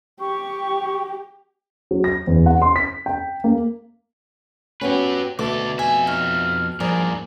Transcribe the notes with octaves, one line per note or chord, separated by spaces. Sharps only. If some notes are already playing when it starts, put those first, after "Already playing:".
G4 C#6
F#3
A#6
E2
F#5
C6
B6
G5
A#3
F#3 B3 C#4 G4 B4
D2 B2 A3 A4 D6
F2 E5 G#5
D#4 C#5 F6
G2 A#2 F3 G#4 A#4 D5